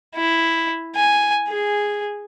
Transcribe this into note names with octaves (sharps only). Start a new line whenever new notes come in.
E4
G#5
G#4